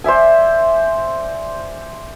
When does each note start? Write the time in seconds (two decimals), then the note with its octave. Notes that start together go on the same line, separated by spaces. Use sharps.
0.04 C5 D5 E5 G#5